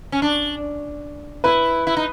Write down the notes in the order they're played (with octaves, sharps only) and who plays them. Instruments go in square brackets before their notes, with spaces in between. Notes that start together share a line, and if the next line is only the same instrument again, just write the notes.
[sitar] C#4
D4
[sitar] E4 [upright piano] B4
[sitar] E4
D#4